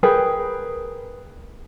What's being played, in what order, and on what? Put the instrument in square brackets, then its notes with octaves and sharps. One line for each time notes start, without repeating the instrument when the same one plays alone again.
[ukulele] G#4 A#4 B4 G5